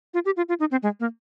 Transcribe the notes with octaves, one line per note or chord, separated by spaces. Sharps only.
F4
G4
F4
F4
D#4
C4
G#3
A#3